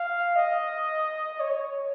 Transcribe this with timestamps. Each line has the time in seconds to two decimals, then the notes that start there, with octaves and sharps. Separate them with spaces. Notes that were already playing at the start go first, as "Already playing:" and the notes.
Already playing: F5
0.36 D#5
1.40 C#5